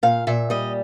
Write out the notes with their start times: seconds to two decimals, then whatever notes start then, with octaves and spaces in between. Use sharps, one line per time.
0.03 A#2 F5
0.27 A#2 E5
0.50 G3 D#5